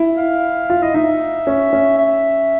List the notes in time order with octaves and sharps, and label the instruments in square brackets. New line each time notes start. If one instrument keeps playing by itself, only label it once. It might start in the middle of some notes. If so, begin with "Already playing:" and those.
Already playing: [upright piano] E4
[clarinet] F5
[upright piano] F4
[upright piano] E4 [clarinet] D#5
[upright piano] D#4 [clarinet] E5
[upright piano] C#4
C#4
[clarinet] E5